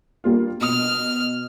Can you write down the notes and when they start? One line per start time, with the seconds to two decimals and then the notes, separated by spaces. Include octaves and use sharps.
0.24 G3 A#3 F4
0.61 B2 D#6 F6